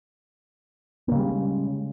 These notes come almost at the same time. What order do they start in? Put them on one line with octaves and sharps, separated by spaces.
A#3 C#3 G3 G#3